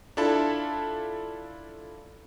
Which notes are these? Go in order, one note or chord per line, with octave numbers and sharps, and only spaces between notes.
D4 E4 F4 A4 A5 B5